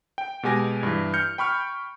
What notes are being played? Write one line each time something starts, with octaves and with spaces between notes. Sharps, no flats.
G5
B2 G#3 G4 G#5 A#6
G2 E3
F6 G6 C#7
G5 B5 C#6 F6